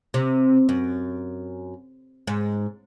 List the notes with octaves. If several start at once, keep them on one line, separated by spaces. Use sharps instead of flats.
C3
F#2
G#2